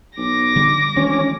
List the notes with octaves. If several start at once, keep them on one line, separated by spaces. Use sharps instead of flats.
B1 D6 A#6
D3 G3 D4
D2 D#3 E3 G#3 C#4